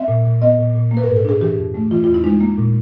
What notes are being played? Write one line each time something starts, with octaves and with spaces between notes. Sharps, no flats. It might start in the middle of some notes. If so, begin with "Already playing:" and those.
Already playing: C4 E5
A#2
A#2
B3 D#5
A#2
A#2
A#3
B4
A#4
G#2
A4
D4 G#4
E3 G4
F2
A3
E3 F4
E2 F4
E4
G#3 D#4
A#3
A#2